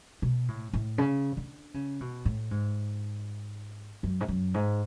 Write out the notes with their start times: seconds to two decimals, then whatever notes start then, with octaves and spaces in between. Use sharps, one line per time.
0.22 B2
0.48 A2
0.73 A2
0.98 C#3
1.37 D3
1.74 C#3
2.01 B2
2.25 A2
2.51 G#2
4.03 F#2
4.21 G#2
4.28 F#2
4.54 G#2